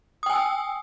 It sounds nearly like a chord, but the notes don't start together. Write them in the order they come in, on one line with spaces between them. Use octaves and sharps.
D#6 G5 G#5 E6